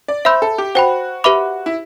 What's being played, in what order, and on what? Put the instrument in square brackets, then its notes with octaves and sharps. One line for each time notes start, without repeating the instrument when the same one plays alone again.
[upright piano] D5
[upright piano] C5 [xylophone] E5 B5 E6 G6
[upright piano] A4
G4
[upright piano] F#4 [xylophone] C5 G5 B5
[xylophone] G4 B4 E5 B5 D6
[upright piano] E4